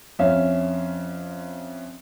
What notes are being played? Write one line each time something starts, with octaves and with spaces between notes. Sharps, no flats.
F2 C#4 E5 F5